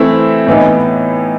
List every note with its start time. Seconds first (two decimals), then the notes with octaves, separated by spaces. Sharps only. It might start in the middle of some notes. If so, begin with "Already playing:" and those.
Already playing: E3 A3 C4 E4
0.47 A2 E3 B3 D#4